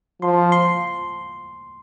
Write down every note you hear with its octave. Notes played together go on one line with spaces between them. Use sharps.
F3 C6
C6